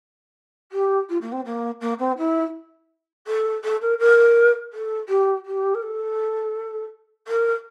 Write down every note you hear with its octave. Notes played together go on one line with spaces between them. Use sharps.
G4
F4
A#3
C4
A#3
A#3
C4
E4
A4
A4
A#4
A#4
A4
G4
G4
A#4
A4
A#4